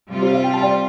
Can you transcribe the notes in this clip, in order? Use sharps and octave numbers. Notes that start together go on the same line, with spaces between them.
C3 G3 F4
G4 C5
C5 F5
G5
A5
D5 G5